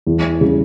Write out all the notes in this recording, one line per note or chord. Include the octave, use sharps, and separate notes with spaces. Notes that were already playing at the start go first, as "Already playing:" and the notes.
E2
C#3 G3